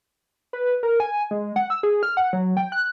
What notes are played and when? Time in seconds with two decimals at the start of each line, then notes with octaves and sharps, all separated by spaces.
0.53 B4
0.83 A#4
1.00 G#5
1.31 G#3
1.56 F#5
1.70 E6
1.83 G#4
2.03 F6
2.17 F#5
2.33 F#3
2.57 G5
2.72 F#6